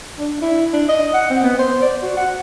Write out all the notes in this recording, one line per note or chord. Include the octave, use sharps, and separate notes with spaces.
D4
E4
D4
D#5
F#5
C4
B3
C5
D5
F#4
F#5